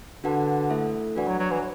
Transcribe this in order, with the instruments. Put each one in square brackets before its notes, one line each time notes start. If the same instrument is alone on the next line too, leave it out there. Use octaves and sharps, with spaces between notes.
[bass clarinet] D3 [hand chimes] D4 F#4 B4 F#5 A5
[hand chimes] A3 E4 A4 E5
[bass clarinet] E3 [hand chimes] D4 F#4 D5 F#5
[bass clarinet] F#3
F#3
E3